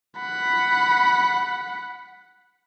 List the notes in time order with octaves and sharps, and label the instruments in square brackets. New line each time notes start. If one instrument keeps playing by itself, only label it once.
[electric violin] F#5 B5